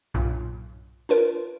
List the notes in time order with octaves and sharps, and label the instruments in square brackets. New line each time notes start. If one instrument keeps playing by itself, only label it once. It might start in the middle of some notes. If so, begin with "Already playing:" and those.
[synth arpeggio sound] B1 G2 A#2
D4 F4 A#4 B4